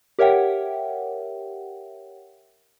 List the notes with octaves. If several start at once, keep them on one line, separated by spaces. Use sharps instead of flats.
G4 A#4 C#5 E5 F#5 G5